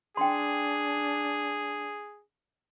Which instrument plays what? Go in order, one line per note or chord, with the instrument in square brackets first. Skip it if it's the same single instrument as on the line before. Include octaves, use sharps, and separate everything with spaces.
[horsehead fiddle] D4 [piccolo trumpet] G#4 [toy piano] G5 C6